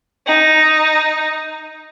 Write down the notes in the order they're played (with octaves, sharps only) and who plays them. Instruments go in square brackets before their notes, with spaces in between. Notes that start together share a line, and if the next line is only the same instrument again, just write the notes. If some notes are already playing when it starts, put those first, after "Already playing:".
[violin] D#4